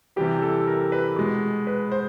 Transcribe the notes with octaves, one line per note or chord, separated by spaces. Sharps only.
C3 E3 G3 G4
A4
A#4
B4
B2 G#3
B4
C5